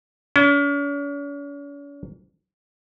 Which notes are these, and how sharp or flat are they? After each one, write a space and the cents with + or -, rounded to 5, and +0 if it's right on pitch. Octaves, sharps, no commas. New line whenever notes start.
C#4 +45